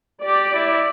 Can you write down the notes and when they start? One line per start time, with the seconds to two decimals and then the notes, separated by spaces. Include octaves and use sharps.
0.24 G4 D5
0.54 E4